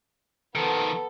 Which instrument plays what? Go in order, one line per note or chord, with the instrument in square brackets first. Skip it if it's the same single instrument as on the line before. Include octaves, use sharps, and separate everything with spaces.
[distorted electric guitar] D#3 F3 [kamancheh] B3 A4